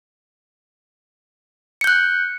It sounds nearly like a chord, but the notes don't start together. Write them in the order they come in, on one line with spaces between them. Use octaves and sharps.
C#7 G6 F#6